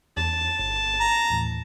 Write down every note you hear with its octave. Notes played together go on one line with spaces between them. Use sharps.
E2 A5
G1
A#5
D#2 A2 E3